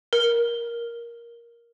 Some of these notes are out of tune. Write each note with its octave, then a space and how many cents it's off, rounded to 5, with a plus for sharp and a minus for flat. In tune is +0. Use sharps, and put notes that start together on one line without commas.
A#4 +10